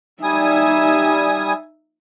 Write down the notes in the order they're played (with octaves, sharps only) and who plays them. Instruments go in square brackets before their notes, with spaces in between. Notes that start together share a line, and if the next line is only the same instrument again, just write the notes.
[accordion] G3 G#5 D#6 [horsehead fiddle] D#4 E5